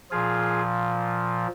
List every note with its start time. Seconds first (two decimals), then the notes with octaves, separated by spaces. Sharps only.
0.11 A#2 F3 F4 G#4